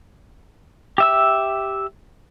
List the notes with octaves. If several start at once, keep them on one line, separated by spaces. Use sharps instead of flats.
G4 E5 E6